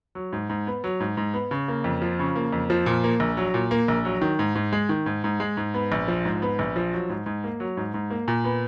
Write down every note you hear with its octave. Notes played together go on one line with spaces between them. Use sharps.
F#3
G#2
G#2
B3
F#3
G#2
G#2
B3
C#3
A#3
F2
F3
C#3
A#3
F2
F3
A#2
A#3
A#1
F#3
A#2
A#3
A#1
F#3
D#3
G#2
G#2
G#3
D#3
G#2
G#2
G#3
G#2
B3
A#1
F3
G#2
B3
A#1
F3
F#3
G#2
G#2
A#3
F#3
G#2
G#2
A#3
A#2
B3